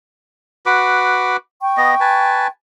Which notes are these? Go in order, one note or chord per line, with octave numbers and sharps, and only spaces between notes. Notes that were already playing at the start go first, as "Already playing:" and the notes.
F#4 B4 D6
G5 C#6
B3 D#5
B4 G#5 A5